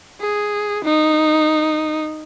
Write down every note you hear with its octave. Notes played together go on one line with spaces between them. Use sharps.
G#4
D#4